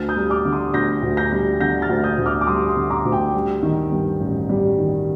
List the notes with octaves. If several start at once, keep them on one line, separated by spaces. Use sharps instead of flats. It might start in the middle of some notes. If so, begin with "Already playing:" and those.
Already playing: D2 F6 A6
D#6 G6
G3
D6 F6
D3
C6 D#6
D2 G6 A#6
D2
G6 A#6
G3
D3 G6 A#6
F6 A6
D2
D#6 G6
D2
D6 F6
D6
G3 C6 D#6
C6 D#6
D3
A#5 D6
D2
G5
G3
D#3
G2
A1
G3
D#3